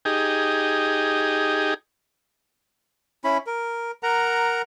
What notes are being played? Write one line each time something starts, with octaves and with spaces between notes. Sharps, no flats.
D#4 G4 G#4
C#4 E4 B5
A#4
A#4 F#5 A#5